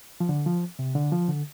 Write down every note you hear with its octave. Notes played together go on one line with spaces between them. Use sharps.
F3
D3
F3
C3
D3
F3
D3